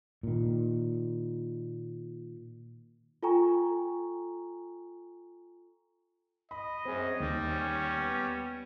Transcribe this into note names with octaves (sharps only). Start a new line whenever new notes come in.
A#2 D#3
F4 A4 G5 G#5 A#5 C#6
D#5 B5
F#2 C4 C#4 G#4
D#2 G3
C#4
B3